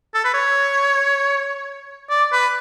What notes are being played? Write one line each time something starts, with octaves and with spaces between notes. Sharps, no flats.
A4
B4
C#5
D5
B4